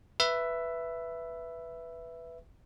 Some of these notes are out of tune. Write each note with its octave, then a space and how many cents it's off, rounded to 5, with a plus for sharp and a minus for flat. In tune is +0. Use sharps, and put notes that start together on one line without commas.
B4 +0 E5 +10